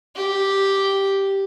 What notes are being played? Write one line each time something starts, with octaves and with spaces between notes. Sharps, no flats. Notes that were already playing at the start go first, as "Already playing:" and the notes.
G4